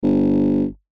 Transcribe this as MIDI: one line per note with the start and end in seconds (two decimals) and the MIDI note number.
0.03 0.64 31